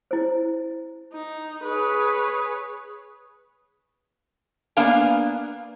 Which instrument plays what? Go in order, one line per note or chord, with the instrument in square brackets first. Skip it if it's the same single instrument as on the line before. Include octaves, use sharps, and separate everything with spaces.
[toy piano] E4 C5
[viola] D#4
[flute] G#4 [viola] B4 C#5
[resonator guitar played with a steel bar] A#3 B3 D4 F5 G#5